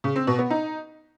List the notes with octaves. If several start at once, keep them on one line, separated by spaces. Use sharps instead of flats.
C#3
C4
B2
B3
D#4